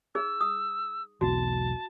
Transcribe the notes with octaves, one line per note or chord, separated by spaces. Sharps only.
D#4 G#4 E6
D#6
E1 B1 F#4 A5